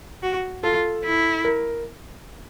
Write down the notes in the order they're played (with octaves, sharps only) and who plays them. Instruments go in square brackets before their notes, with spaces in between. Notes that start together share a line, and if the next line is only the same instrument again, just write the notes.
[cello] F#4
[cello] F4 [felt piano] A4
[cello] E4
[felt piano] A#4